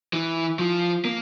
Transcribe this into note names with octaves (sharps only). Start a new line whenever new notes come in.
E3
F3
A#3